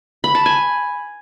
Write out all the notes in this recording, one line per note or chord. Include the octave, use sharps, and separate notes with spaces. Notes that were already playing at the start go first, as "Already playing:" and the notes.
B5
A5
G#5